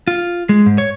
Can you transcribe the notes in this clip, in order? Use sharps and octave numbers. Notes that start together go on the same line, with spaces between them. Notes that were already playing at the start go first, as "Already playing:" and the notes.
F4
G#3
G#2
C#5